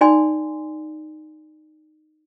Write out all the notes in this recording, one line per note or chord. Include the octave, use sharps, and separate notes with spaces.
D#4 D5 G#5 C6